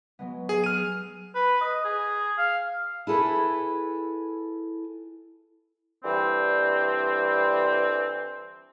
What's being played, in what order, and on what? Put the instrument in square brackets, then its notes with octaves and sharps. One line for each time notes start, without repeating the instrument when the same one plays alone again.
[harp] F#3 G#3 B3
[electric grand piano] G#4
F6 D#7
[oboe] B4
D#5
G#4
F5
[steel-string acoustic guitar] E4 G#4 A4 B4
[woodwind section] D3 E3 G3 C4